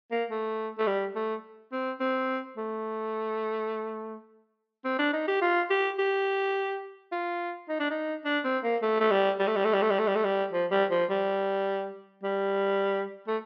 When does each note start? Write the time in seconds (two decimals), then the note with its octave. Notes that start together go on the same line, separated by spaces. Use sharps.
0.11 A#3
0.30 A3
0.79 A3
0.87 G3
1.16 A3
1.72 C4
2.00 C4
2.57 A3
4.85 C4
4.99 D4
5.13 D#4
5.28 G4
5.42 F4
5.70 G4
5.99 G4
7.12 F4
7.69 D#4
7.80 D4
7.90 D#4
8.25 D4
8.45 C4
8.64 A#3
8.82 A3
9.00 A3
9.11 G3
9.39 G3
9.48 A3
9.56 G3
9.65 A3
9.73 G3
9.82 A3
9.90 G3
9.99 A3
10.07 G3
10.15 A3
10.24 G3
10.53 F3
10.72 G3
10.91 F3
11.10 G3
12.23 G3
13.27 A3